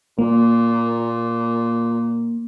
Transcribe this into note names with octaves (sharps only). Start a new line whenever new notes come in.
A#2 A#3